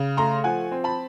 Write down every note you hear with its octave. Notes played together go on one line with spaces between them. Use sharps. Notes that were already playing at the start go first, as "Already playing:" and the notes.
Already playing: C#3
A3 A#5 C6
F3 F#5 G#5
C4
A5 B5